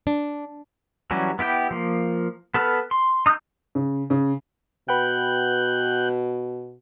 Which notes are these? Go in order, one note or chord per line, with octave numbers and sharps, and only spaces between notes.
D4
E3 F#3 G3 C#4
B3 E4 G4 G5
F3 A#3
B3 A4 B4 F6
C6
D#4 D#6 E6 F#6 G6
C#3
C#3
B2 B4 F#5 G5 F#6 G6